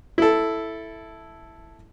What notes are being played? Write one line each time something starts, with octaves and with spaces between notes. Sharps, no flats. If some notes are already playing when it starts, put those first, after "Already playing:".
E4 A4